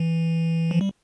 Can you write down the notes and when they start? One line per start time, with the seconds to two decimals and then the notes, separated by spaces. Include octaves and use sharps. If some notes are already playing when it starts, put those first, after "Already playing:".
Already playing: E3
0.71 F3
0.81 G3